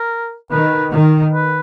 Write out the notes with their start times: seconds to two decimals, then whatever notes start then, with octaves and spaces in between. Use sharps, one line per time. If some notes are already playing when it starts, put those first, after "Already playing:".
Already playing: A#4
0.51 D#3 B4
0.92 D#3
1.32 B4